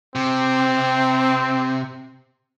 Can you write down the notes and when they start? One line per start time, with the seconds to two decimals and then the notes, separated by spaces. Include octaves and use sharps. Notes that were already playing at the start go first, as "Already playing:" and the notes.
0.15 C3 C4